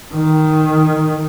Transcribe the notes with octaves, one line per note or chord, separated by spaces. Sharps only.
D#3